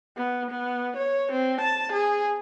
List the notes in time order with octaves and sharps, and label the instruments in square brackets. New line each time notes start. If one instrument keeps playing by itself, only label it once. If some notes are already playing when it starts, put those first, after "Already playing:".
[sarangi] B3
B3
C#5
C4
A5
G#4